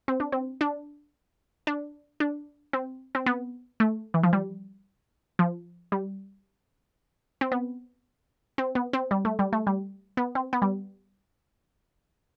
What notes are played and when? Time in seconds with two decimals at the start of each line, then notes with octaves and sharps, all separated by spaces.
0.08 C4
0.20 D4
0.32 C4
0.61 D4
1.67 D4
2.20 D4
2.73 C4
3.15 C4
3.26 B3
3.80 A3
4.14 E3
4.23 F3
4.33 G3
5.39 F3
5.92 G3
7.41 C4
7.52 B3
8.58 C4
8.75 B3
8.93 C4
9.11 G3
9.25 A3
9.39 G3
9.53 A3
9.67 G3
10.17 B3
10.35 C4
10.53 B3
10.62 G3